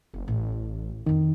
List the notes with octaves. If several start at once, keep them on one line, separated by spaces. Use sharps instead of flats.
F#1 C4
A1 A2
F2 D#3 D#4